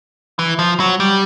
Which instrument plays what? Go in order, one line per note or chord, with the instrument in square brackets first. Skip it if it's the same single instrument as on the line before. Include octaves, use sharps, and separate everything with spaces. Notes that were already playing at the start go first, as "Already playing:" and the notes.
[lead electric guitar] E3
F3
F#3
G3